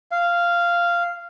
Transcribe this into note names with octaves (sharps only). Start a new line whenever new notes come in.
F5